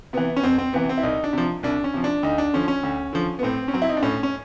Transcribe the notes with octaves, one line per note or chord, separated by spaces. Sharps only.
C3 E3 B3
C#4
F2 C4
C4
C3 E3 B3
C4
E4
C2 D#4
D4
C3 F3
C2 D4
C#4
C3 F3
D4
D2 D#4
D4
D3 F3 C#4
C#4
D2
D3 F3
B3
A2 C4
C#4
F#3 C4
E4
D#4
D4
A2 C#4
C#4